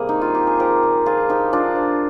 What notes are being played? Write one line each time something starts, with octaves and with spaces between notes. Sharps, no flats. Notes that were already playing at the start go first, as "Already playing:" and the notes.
Already playing: C3 G3 A#3 G#4
D#3 D#4
F4
D#3 G4
G#4
F3 G4 A#4
A#2
F3 F4 G#4
F3 D#4 G4
F3 D4 F4
F3